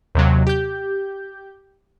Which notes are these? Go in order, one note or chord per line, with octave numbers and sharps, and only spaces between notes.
D#2 C3 F#3
G4 G6